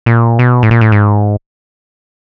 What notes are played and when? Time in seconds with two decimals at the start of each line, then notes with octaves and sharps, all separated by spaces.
0.06 A#2
0.39 B2
0.63 A2
0.71 A#2
0.81 A2
0.92 G#2